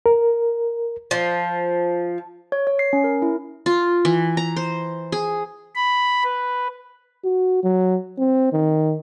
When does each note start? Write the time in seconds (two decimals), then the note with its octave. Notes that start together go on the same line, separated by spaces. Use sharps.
0.06 A#4
1.11 F3
2.52 C#5
2.67 C#5
2.79 C7
2.93 C#4
3.04 A#4
3.22 E4
3.66 F4
4.05 E3
4.37 A#5
4.56 C5
5.12 G#4
5.75 B5
6.23 B4
7.25 F#4
7.64 F#3
8.18 C4
8.53 D#3